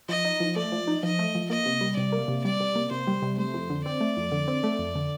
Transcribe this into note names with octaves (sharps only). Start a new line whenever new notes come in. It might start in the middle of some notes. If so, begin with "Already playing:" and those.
F3 D#5
D#4
F3
A3 D5
F3
D#4
F3 D#5
A3
F3
A#3 D#5
C3
G3
C3 D5
A#3
C3
G3 D5
C3
A#3
C3 C5
G3
C3
A3 C5
F2
D3
C4 D5
A3
F2
D3
C4
A3
F2
D3